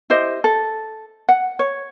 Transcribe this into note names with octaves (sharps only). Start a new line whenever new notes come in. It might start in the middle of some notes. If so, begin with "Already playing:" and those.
E4 G4 C5 D#5
A4
F#5
C#5